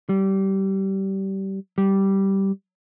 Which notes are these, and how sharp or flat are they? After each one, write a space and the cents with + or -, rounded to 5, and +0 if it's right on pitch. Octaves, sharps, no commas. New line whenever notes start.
G3 -20
G3 -10